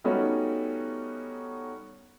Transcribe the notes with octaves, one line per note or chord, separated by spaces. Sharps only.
G3 A3 B3 C#4 D#4 F#4